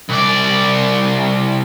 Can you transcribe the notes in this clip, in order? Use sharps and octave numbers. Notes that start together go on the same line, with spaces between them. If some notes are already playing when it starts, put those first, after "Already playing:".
C2 D5